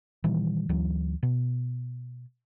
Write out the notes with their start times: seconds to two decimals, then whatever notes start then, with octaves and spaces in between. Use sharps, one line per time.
0.24 A#2 D#3 E3 G3
0.69 D2 E3 F#3
1.23 B2